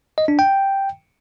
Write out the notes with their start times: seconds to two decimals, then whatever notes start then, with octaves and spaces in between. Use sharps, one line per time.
0.18 D#5
0.28 D4
0.39 G5